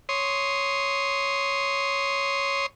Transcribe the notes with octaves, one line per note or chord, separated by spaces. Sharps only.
C#5 C6 D#6